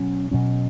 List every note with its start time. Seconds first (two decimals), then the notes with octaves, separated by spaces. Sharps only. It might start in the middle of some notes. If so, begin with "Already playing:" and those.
Already playing: B2 F#3 C#4
0.31 B2 F#3 C#4